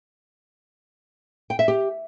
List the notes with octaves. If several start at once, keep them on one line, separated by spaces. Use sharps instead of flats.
G5
E5
G4